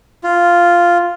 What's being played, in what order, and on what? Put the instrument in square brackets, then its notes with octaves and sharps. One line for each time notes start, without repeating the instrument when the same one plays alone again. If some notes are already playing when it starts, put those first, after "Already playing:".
[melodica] F4